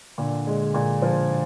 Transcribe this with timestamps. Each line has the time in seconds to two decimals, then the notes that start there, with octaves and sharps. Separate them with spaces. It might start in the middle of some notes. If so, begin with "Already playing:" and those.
0.18 A#2 D3
0.47 G#3
0.74 A#2
1.02 F3